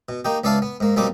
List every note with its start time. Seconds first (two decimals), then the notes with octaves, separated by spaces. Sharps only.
0.09 B2
0.25 A#3 D#4 G4
0.44 C#2 B3 D5 E5 F5 A5
0.62 B3
0.80 G#2 A#3
0.96 B1 G3 A#3 C4 D#4 D6